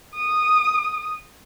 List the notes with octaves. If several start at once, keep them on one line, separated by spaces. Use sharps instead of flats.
D#6